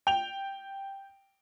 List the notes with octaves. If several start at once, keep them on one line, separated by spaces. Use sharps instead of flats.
G5 F7